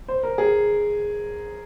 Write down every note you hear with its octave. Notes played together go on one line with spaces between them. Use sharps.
C5
A#4
G#4